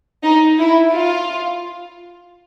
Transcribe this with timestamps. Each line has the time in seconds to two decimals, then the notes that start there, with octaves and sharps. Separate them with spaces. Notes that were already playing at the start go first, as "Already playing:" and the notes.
0.23 D#4
0.58 E4
0.92 F4